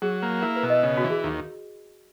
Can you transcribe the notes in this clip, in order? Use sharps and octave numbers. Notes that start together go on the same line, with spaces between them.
F#3 G#4
A#3
E4 A#4
B4
B2
D#5
C#3
F#4
E3
G#4
D#2